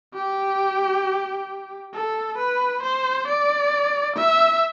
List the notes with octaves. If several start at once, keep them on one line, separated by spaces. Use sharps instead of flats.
G4
A4
B4
C5
D5
E5